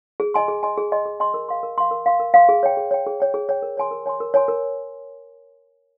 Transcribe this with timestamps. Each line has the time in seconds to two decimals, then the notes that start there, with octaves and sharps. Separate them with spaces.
0.20 G#4
0.34 D#5 G#5 C6
0.48 G#4
0.63 D#5 G#5 C6
0.78 G#4
0.92 D#5 G#5 C6
1.06 G#4
1.20 D#5 G#5 C6
1.34 A#4
1.49 F5 C6
1.63 A#4
1.78 F5 C6
1.91 A#4
2.06 F5 C6
2.20 A#4
2.34 F5 C6
2.49 G#4
2.63 C#5 G5
2.77 G#4
2.91 C#5 G5
3.06 G#4
3.20 C#5 G5
3.34 G#4
3.49 C#5 G5
3.62 A#4
3.77 C#5 G#5 C6
3.91 A#4
4.06 C#5 G#5 C6
4.20 A#4
4.34 C#5 G#5 C6
4.48 A#4